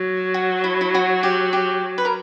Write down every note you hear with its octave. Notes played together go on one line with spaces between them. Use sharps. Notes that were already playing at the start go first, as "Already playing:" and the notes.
Already playing: F#3
F#4
E4
E4
F#4
G4
G4
B4
A#4